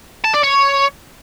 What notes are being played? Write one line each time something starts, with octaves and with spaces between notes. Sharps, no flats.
A5
D5
C#5